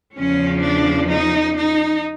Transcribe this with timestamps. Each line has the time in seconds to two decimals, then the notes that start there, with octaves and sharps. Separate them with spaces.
0.16 E2 C#3 F3 C#4
0.63 D4
1.10 D#4
1.55 D#4